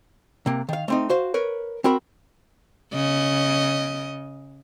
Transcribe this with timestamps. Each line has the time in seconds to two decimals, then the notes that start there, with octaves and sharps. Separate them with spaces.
0.46 C3 A#3
0.69 D#3 F5
0.88 A3 C4 D#4
1.10 F#4 C5 F5
1.34 A#4 B4 C#5
1.84 C4 F#4 A#4 B5
2.93 C#3 D#5